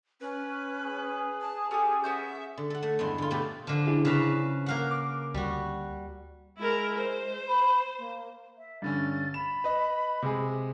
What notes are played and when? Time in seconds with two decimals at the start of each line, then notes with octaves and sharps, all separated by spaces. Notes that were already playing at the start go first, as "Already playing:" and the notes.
0.21 C#4 B4
0.81 G#4
1.41 A5
1.71 C#4 G4 A4 G#5
2.04 B3 C#4 F#4 E5 G6
2.57 D3
2.70 A4 F#5
2.83 A3
2.99 E2 G2 G#3 E4 C6
3.18 D3 F4
3.31 B2 A3 G4 G#4 B4 E5
3.67 D3 F3
3.86 D4 E4 G#4
4.05 C#3 B4 A#5
4.66 A#3 F5 F#5
4.91 D6
5.34 D2 G3 F#4
6.57 G#3 E4 A#4
6.98 C5
7.48 B5
7.98 A#3
8.58 E5
8.82 G2 D3 C#4 A6
9.34 B5 E7
9.64 B4 D#5
10.22 C3 G#3 G#4